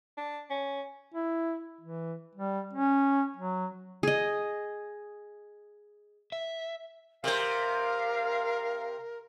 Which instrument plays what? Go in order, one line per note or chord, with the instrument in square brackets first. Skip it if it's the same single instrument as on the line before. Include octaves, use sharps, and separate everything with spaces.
[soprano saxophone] D4
C#4
[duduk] E4
E3
G3
C#4
F#3
[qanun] G#4 D#5
[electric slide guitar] E5
[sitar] C3 C5 [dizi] A#4 [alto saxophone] F5